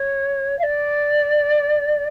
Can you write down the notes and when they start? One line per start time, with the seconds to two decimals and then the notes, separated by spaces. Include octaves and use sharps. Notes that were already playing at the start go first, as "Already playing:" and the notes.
Already playing: C#5
0.59 F5
0.63 D5